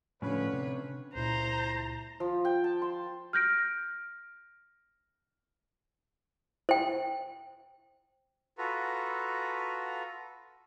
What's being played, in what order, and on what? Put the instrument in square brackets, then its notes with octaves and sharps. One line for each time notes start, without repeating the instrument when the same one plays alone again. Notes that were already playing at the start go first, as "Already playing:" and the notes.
[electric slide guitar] A2 F3 [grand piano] D3 C#4 [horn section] B4 C#5
[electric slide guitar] C3
[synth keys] C#2 A#2 E4 [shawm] C5 [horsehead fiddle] A#5
[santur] F3
G5
A5
C6
[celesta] F6 G6 A#6 D7
[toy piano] C5 G5
[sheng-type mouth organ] F4 F#4 A4 B4 A#5